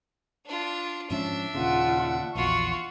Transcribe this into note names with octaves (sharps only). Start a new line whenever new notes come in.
D4 F4
G#2 F3 C#4 D4 E5
D#2 A#2 C#3 F4 F#5
A#1 E2 F4 F#4 C#6